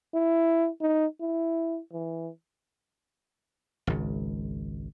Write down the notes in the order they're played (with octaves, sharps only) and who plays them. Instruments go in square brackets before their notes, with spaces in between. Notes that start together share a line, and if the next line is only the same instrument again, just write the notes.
[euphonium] E4
D#4
E4
E3
[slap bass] G#1 C#2